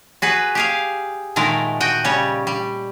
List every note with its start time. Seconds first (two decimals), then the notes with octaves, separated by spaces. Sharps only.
0.22 F#4 G#4 B4
0.55 G4 G#4 F5
1.36 A#2 D#3 G#3 A3 A#4
1.80 F#4 D#5 G5
2.04 C#3 G3 C#5
2.47 G3